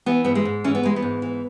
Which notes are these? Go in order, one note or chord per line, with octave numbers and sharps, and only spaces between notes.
E3 B3
G#2 B3
G#3
G#2
E3 C#4
B3
E3 G#3
B3
G#2
E3